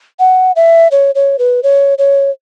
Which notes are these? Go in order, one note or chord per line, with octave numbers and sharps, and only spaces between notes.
F#5
E5
C#5
C#5
B4
C#5
C#5